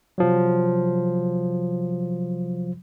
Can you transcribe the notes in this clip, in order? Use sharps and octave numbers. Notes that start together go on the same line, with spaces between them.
C3 F3 F#3